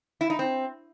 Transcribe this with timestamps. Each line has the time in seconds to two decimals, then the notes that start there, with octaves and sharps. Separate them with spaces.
0.21 E4
0.30 D#4
0.39 C4